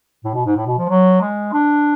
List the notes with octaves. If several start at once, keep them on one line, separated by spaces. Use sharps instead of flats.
A2
B2
G#2
A2
B2
F3
F#3
G#3
D4